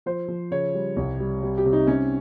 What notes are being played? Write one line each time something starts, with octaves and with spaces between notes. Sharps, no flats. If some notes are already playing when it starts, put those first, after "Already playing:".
F3 C5
F3
C#3 C#5
G3
C2
G3
G3
G4
C3
D#4
C3 C#4